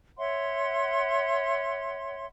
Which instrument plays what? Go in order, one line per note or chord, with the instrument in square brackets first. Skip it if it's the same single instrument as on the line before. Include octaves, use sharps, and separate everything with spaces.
[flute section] C#5 E5 F#5 C6